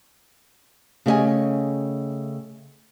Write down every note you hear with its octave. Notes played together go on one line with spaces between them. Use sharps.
C#3 A3 G4 G#4 D#5 G#5